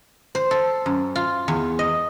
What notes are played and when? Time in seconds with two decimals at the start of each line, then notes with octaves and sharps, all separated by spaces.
0.35 C5
0.51 A4
0.86 F#2
1.15 F4
1.48 E2
1.79 D#5